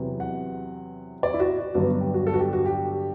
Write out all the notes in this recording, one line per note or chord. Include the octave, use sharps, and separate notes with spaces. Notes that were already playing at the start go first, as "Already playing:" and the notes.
Already playing: E2 C3 F#3 B3
F#5
D5
E4
F#4
G2 D3 F#3 B3 F#4
G4
F#4
A4
F#4
G4
F#4
G4